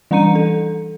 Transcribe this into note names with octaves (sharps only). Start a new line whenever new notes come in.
E3 G3 D4 A#5 C#7 D#7
A4